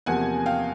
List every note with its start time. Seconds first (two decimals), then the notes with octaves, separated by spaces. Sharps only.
0.06 E2 C3 F3 A#3 F#5 G#5
0.46 F5 G5